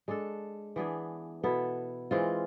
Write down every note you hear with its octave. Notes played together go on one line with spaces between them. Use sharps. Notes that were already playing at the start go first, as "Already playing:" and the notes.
G#3 D4 A4
E3 B3 D4 G#4
B2 B3 E4 A4
E3 G#3 C4 F4